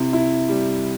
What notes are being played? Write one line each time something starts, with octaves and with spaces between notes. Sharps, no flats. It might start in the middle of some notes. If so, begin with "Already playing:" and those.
Already playing: C3 E4
E4
G3